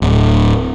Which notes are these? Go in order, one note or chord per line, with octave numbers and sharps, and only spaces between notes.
D1